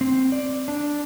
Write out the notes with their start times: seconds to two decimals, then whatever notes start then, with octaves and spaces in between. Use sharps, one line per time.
0.01 C4
0.32 D5
0.68 D4